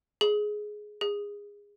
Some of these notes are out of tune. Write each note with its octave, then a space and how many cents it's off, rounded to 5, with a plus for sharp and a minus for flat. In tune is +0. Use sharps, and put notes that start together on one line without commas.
G#4 +10
G#4 -20